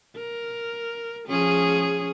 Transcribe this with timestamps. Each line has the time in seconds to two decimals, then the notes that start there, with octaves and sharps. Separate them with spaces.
0.16 A#4
1.28 F3 C#4 G#4